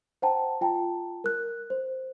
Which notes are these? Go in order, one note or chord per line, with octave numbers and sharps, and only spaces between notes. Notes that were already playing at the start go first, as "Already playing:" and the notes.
C5 F#5 G5 A5 A#5
F4 G5 A5 A#5
A#4 F#6
C5